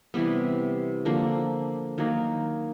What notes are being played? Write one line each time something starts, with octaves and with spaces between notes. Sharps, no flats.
C3 E3 G3 B3
D3 F3 A#3 D4
D#3 F#3 A#3 D#4